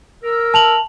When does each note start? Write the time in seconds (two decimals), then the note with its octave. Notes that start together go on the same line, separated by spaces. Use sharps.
0.23 A#4 E6
0.54 A5 F7 F#7